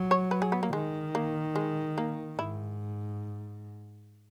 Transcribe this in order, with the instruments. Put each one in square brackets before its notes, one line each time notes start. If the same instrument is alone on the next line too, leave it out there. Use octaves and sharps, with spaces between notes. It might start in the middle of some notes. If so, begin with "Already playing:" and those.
Already playing: [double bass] F#3
[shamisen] C#5
B4
G#4
B3
A#3
[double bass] D#3 [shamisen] G#3
[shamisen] A#3
G#3
A#3
[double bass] G#2 [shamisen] E4